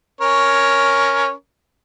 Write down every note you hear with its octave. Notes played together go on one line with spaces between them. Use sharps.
C#4 A#4 C#5